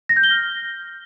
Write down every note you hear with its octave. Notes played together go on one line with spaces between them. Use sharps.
A#6
G6
G7
F6